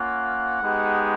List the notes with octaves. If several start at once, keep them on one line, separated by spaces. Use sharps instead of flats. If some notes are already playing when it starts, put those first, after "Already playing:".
Already playing: A#3 C#4 F4 F#5
G#3 B3 D#4 G4